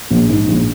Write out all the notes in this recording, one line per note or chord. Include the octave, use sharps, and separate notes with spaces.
A#1
G#2
A#1